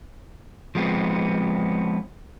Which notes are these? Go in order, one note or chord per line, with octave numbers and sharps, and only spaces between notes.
F3 G#3 B3 C4